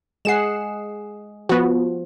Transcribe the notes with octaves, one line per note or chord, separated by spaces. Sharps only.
G#3 G#4 F#5 C7 E7
F3 B3 F#4